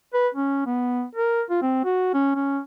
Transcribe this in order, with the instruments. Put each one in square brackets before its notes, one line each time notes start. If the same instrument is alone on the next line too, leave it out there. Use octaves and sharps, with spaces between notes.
[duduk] B4
C#4
B3
A#4
F4
C4
F#4
C#4
C#4